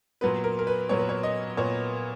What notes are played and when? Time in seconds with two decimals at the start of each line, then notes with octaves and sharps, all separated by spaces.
0.21 A#2 F#3 B3 B4
0.44 A#4
0.59 A#4
0.67 B4
0.89 A#2 F#3 B3 C#5
0.99 B4
1.09 C#5
1.23 D#5
1.57 A#2 B3 C#5